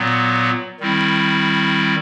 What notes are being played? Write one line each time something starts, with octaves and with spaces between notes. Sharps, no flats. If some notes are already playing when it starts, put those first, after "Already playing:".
Already playing: A#2 F#3 B3
D#3 G3 C4 E4